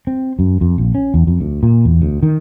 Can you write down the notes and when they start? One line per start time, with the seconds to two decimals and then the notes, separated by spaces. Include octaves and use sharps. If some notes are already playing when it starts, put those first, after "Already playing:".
0.07 C4
0.39 F#2
0.61 F2
0.78 A#1
0.95 C#4
1.14 E2
1.27 F2
1.41 D2
1.63 A#2
1.85 E2
2.02 D2
2.23 D#3